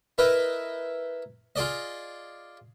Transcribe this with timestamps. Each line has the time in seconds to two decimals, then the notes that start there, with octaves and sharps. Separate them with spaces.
0.18 E4 A#4 B4 D#5 E5
1.56 F4 G#4 D5 D#5